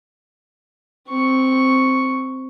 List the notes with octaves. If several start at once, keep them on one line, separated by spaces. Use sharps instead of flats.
C4 C#6